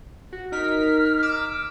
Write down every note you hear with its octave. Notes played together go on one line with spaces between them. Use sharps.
F#4
D#4 A#4 F6 B6
D6 E6